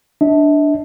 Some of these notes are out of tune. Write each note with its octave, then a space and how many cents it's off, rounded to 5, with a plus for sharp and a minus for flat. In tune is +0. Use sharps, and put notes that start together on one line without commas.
D4 +0 E5 -45